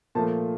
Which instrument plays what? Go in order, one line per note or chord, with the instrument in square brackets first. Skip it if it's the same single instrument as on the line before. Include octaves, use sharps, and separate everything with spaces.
[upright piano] A#2 F3 A3 A5